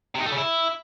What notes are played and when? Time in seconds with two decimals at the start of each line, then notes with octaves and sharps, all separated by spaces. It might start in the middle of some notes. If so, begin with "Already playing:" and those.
0.15 C3
0.21 D#4
0.26 A3
0.32 C#3
0.38 E4